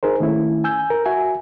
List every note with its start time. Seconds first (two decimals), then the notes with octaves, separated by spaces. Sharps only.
0.03 D#4 G#4 A#4 C5
0.20 D#3 A3 C#4 E4
0.64 G#5 E6 G6
0.90 A#4
1.06 F#4 E5 G#5